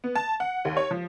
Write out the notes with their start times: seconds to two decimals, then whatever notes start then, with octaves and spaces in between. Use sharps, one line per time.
0.04 B3
0.15 A5
0.40 F#5
0.65 D#2
0.77 C#5
0.91 F3